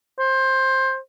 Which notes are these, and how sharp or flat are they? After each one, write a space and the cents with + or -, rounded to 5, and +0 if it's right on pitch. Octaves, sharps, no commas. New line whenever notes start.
C5 +15